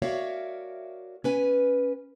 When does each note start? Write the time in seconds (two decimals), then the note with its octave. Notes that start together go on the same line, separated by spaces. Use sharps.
0.02 F#4 A#4 C#5 D5 E5 F5
1.24 C#4 B4 G#5